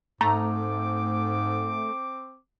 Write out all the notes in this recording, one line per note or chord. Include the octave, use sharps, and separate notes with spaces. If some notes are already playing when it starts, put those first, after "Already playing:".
G#2 A3 C4 A#5 D6